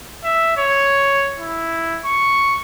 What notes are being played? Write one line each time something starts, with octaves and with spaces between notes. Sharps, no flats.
E5
C#5
E4
C#6